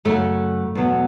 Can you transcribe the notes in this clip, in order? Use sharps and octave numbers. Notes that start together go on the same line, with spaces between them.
F#2 C#3 F#3 A3
E2 B2 F#3